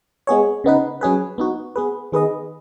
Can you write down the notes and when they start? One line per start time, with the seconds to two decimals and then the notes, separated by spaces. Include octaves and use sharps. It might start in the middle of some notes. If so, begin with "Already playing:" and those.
0.27 G#3 B3 G#4 C#5
0.64 C#3 B3 D#4 B4
1.01 F#3 C#4 G#4 B4
1.38 B3 D#4 F#4
1.76 B3 G#4 B4
2.12 D#3 B3 G#4 B4 D#5